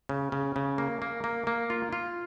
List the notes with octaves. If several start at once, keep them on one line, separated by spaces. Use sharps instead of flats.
C#3
C#3
C#3
A#3
A#3
A#3
A#3
F4
F4